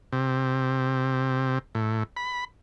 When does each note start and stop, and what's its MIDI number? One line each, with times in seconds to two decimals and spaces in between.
0.13 1.59 48
1.75 2.03 45
2.17 2.44 83